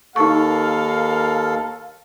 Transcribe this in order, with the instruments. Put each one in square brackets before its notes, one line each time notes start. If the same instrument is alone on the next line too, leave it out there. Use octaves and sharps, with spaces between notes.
[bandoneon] D#2 A4 [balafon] D#4 C#6 [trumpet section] A#4 F5